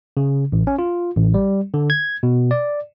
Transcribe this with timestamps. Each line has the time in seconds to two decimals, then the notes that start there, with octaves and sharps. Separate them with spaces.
0.17 C#3
0.52 A1
0.67 C#4
0.79 F4
1.16 A1
1.34 G3
1.74 D3
1.90 G#6
2.23 B2
2.51 D5